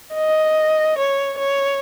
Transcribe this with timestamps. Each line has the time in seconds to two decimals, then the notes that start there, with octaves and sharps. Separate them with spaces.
0.14 D#5
0.98 C#5
1.39 C#5